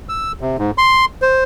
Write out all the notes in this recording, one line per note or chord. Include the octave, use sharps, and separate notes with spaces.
E6
C3
G#2
C6
C5